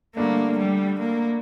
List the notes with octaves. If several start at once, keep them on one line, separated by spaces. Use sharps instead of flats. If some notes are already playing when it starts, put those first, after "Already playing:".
G2 D3 A3 A#3 D4
G3
A#3